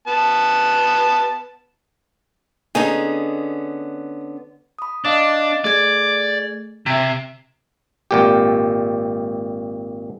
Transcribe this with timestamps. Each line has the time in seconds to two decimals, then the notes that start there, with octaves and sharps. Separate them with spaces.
0.07 B3 A5
2.75 D3 B3 C#4 D#4 G#4
4.79 B5 D#6
5.05 D4 D#5 F5 D6
5.64 A3 G#4 D5 G#6
6.86 C3 E5 G#6
8.11 G#1 A#2 G4